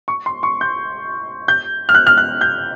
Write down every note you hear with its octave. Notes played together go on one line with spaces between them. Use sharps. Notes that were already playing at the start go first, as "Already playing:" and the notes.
C#6
C6
C#6
G6
G6
F6
F#6
F6
F#6
G6